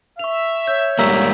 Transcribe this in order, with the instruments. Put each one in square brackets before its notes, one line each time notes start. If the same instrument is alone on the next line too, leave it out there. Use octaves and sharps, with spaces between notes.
[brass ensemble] E5 [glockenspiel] C#6 F7
[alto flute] C#5 [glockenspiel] G6
[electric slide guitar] G#2 G3 A#3 [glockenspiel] A#5 E6 B6